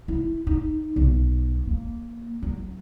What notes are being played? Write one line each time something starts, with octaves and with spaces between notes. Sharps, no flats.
E4
D#4
B1
A#3
F#3